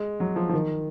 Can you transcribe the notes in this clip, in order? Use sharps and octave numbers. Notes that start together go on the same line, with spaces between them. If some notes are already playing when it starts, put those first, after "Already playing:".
Already playing: G#3
F#3
F3
F3
D#3